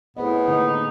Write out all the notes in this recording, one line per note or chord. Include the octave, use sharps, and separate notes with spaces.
A2 B3 G#4 C5 D#5
D3 A#3 D#4